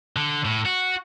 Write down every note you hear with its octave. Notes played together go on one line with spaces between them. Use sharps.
D3
A2
F#4